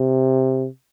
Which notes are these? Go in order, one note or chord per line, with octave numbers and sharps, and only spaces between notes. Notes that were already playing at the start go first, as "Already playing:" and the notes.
Already playing: C3